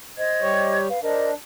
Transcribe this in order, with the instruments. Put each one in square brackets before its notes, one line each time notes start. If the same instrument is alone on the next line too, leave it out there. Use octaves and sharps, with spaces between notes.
[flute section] C5 D#5 G#6
[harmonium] G3 G4 C#5
[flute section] B4 F5
[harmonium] D4 [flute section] A#4 C5 D#5